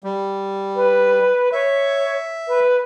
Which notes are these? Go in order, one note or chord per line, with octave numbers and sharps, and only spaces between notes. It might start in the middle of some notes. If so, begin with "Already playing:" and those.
G3
B4
C#5 E5
B4